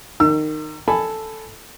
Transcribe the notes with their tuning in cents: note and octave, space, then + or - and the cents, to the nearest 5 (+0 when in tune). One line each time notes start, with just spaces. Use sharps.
D#3 -20 E6 +35
A4 +0 G#5 +0 B5 +15